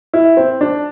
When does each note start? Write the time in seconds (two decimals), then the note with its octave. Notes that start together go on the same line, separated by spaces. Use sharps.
0.14 E4
0.37 C4
0.61 D4